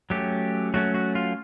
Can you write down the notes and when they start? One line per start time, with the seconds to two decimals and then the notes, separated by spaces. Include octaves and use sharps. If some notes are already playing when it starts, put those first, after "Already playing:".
0.10 F#3 A3 C#4 G4
0.74 F#3 A3 C#4 F#4
0.95 F#4
1.15 F4